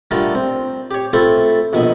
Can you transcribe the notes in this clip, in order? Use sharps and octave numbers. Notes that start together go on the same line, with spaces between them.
D3 G3 A3 F4 A#4
C4
G4 C#5
A3 C4 E4 F4 A4 E5
A#1 B2 D#3 E5